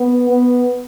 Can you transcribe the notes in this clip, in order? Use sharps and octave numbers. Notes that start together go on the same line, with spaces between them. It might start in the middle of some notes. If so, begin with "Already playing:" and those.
Already playing: B3
B3